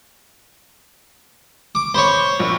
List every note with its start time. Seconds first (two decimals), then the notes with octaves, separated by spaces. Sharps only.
1.75 D6
1.94 C5 C#5 B5 C#6
2.39 A#1